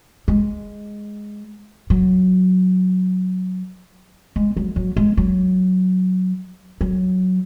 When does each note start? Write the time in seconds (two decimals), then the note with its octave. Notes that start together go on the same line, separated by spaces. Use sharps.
0.28 G#3
1.90 F#3
4.36 G#3
4.57 F#3
4.76 F#3
4.97 G#3
5.17 F#3
6.81 F#3